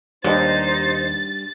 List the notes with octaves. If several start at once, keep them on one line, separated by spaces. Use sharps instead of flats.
D#2 G3 D4 D#4 G4 C5 A6